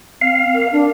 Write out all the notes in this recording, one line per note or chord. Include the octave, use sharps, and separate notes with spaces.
C4 F5
A#4
D4